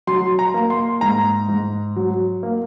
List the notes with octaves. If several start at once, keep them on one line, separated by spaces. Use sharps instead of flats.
F#3 C6
A#5
A#3
C6
G#2 A#5
G#2
F#3
A#3